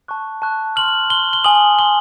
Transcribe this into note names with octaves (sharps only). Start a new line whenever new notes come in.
A5 C#6 F#6
A5 C#6 F#6
C6 F6 F#7
C6 F6 G7
G7
G#5 C6 D#6 F#7
G#5 C6 D#6 G7